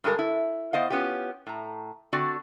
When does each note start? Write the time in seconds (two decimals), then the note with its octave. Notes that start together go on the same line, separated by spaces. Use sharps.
0.04 G2 G#3 G4 A4 A#4
0.19 E4
0.73 B3 C5 D#5 F5
0.90 B3 C#4 F4 G4
1.47 A2 A#5
2.13 D3 C4 F#4 D5